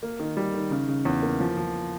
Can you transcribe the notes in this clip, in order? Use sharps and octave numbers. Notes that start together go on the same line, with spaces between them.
A#3
D#3
G3
D#3
C#3
C#3
E2
A#3
F3
F3